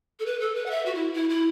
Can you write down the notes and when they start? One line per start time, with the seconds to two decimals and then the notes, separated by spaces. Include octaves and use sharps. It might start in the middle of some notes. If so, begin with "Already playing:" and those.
0.19 A4
0.26 B4
0.40 A4
0.55 B4
0.66 F#5
0.70 E5
0.85 F#4
0.94 E4
1.14 E4
1.29 E4